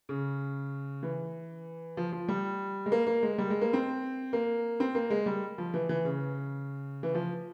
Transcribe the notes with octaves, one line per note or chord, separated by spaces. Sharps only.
C#3
E3
F3
F3
G3
G#3
A#3
A#3
G#3
G3
G#3
A#3
C4
A#3
C4
A#3
G#3
G3
F3
E3
E3
C#3
E3
F3